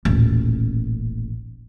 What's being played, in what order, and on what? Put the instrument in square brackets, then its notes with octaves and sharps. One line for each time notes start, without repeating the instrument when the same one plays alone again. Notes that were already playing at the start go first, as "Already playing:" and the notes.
[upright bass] D#1 A1